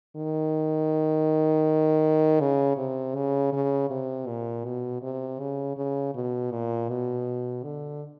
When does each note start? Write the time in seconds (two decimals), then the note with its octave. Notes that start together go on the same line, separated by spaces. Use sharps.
0.16 D#3
2.40 C#3
2.78 C3
3.15 C#3
3.53 C#3
3.90 C3
4.27 A#2
4.65 B2
5.02 C3
5.40 C#3
5.77 C#3
6.14 B2
6.51 A#2
6.89 B2
7.63 D3